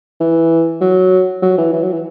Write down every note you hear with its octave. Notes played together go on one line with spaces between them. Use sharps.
E3
F#3
F#3
E3
E3
F#3
E3